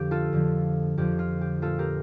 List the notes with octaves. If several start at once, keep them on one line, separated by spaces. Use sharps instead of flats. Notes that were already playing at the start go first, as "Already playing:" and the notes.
Already playing: F2 D3 F3 G4
F4 A4
F2 D3 F3
F2 D3 F3 G4
F4
G4
A#2 F3 A3 F4 A4
G4 A#4